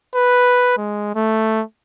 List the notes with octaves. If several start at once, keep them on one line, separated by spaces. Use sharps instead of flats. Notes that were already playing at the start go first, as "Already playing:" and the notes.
B4
G#3
A3